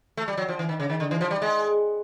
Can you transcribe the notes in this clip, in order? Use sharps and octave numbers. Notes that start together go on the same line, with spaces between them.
A3
G3
F#3
F3
E3
D#3
C#3
D#3
D3
E3
F3
G3
G#3